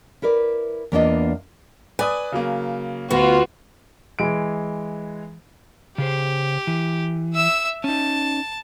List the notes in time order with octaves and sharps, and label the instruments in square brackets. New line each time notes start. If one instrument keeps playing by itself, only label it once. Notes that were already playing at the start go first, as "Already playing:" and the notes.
[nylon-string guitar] E4 A#4 B4 D5
E2 A#3 B3 D4 F4 D#5
[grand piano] B4 D5 D#6 [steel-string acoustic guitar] G#5
[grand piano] C#3 F#3 A#3
[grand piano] D2 [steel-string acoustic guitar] B3 [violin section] F4 F#4
[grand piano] E3 G#3 D7
[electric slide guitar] C#3 G#4 C5 [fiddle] G4
[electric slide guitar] E3
[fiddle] E5 E6
[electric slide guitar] C#4 D#4 [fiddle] A5